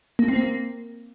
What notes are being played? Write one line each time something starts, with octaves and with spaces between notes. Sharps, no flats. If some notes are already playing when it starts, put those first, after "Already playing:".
A#3
C4
A#3